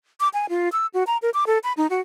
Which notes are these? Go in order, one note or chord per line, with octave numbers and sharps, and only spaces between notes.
D6
G#5
F4
E6
F#4
A#5
A#4
D6
A4
B5
D#4
F#4